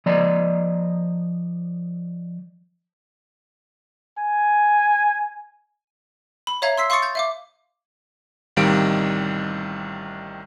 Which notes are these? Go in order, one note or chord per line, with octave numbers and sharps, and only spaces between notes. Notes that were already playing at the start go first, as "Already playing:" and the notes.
F3 D5 D#5 A#5
G#5
B5
C#5 E5 F5 A#5 G#6
C6 E6 B6 C7
F5 C6 C#6 D#6 A6 C#7
G6 A6
E5 F5 D6
A1 C3 D#3 G3 F5 D7